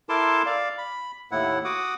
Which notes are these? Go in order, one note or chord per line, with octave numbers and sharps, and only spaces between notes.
E4 A4 A#4 A5 C6 D6
D5 F5
B5
D#2 A2 E4 F#5
F#4 F#5 D6 D#6